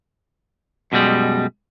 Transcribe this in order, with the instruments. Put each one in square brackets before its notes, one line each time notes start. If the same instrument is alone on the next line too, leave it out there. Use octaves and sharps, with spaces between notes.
[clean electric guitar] F#2 B2 D#3 G3 G#3